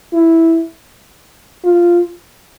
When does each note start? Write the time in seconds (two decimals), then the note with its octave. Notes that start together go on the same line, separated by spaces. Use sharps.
0.13 E4
1.65 F4